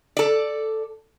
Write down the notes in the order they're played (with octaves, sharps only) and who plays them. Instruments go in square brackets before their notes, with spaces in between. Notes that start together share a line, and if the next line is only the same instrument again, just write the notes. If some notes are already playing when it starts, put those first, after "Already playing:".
[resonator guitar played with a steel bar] A4 D5